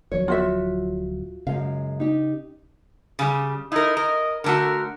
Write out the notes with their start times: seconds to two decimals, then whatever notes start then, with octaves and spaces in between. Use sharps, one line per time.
0.12 D1 F3 F#3 C#5
0.28 F4 F#4 E5
1.47 F#2 C#3 G#3 F5
2.00 D#4 G4
3.19 C#3 G3
3.72 D#4 E4 A#4
3.97 A#4 D#5
4.44 D3 A3 F#4 A#4